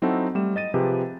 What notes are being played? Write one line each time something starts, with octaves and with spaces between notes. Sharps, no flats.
F#3 C4 D#4 E4 F#4 A4
G3 A3 E7
D#5 A6 D#7
C3 F3 G4 G#4 B4